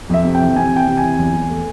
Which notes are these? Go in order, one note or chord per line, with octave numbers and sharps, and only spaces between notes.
F2 E5
C3
G5
E3
C3 G#5
E3
G5
C3
G#5
E3
E2
E2
A3